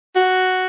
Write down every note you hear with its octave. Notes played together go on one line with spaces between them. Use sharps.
F#4